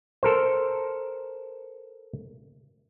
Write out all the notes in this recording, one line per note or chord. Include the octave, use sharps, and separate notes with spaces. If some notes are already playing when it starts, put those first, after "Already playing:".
A4 A#4 C5